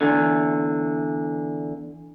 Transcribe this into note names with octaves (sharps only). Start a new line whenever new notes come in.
E2 D3